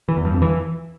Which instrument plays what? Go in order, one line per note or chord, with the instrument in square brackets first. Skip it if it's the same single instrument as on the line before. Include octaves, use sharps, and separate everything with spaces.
[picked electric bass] E3
E2
G2
F2
E3